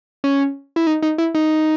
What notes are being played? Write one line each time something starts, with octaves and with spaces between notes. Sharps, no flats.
C#4
E4
D#4
D#4
E4
D#4